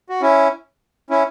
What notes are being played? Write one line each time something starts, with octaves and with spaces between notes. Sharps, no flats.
F#4
C#4 E4
C#4 E4